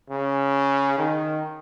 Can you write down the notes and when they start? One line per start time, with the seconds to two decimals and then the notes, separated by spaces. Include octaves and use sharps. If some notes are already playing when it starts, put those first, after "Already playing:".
0.10 C#3
0.98 D#3